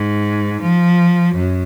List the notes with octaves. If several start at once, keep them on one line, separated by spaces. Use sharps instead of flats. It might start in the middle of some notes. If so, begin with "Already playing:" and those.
Already playing: G#2
F3
F#2